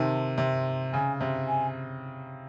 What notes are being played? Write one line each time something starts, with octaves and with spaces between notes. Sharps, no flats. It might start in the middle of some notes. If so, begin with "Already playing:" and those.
Already playing: C3 D#3 A5
C3
C#3 G#5
C3
G#5